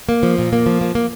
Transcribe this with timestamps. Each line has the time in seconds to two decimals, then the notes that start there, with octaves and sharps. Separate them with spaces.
0.09 A#3
0.23 F3
0.38 A#2
0.53 A#3
0.66 F3
0.81 A#3
0.95 A#3